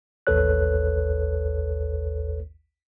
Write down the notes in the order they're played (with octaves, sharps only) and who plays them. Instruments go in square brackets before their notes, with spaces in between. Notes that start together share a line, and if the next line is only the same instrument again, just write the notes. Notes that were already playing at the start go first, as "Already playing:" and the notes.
[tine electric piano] A1 D#2 A4 B4 C#5 F#6